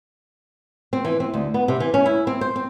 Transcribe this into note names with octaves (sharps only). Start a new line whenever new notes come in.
C4
E3
C4
D2
B3
C3
E3
C#4
E4
C4
C5
C4